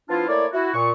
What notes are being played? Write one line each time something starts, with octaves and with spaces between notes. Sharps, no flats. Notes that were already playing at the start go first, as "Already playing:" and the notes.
F3 B3 D4 E4 F4
A3 A#3 E4 C#5 D5
E4 F#4
A#2 C#6